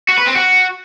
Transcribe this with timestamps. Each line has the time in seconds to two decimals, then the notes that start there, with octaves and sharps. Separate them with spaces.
0.09 F#4
0.17 B4
0.26 C4
0.35 F#4